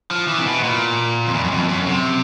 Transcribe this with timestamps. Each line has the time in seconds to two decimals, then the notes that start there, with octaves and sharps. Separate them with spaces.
0.11 F3
0.28 E3
0.39 C3
0.46 B2
0.63 A#2
1.27 F2
1.34 E2
1.44 F#2
1.51 F2
1.68 F#2
1.86 C3